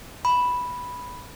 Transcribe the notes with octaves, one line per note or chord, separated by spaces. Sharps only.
B5